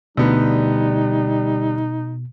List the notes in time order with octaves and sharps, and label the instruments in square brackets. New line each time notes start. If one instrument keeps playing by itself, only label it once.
[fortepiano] D2 B3 [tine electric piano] B2 [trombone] G3 [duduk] D#4